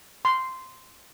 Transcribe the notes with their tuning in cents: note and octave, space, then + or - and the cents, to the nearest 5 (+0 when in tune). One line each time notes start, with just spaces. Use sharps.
C6 -10